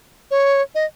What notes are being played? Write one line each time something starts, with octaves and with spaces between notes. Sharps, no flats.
C#5
D#5